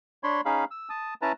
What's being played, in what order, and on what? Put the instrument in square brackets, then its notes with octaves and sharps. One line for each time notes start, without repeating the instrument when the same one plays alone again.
[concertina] D4 C#5 B5 C6
C#4 D#4 G#4 F5 B5
E6
A5 D#6
C#4 E4 B4 A5 A#5